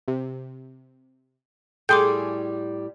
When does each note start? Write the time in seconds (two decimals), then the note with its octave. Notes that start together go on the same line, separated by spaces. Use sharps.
0.08 C3
1.89 A2 G3 G#4 A4 G5 C6 D6 G6